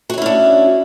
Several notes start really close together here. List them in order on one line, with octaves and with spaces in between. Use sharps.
F#4 C#5 E4 C#4 D4